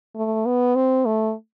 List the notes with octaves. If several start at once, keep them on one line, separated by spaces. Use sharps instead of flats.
A3
B3
C4
A3